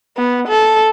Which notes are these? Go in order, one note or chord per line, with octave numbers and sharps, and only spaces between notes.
B3
A4